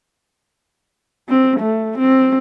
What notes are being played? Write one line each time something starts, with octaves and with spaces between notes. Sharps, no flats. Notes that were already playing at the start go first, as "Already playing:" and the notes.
C4
A3
C4